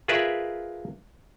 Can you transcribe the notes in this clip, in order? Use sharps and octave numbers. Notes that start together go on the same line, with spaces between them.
F4 G#4 A#4 B4 D5 E5